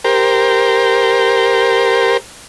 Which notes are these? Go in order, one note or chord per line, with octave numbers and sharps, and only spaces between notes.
G4 A#4 C5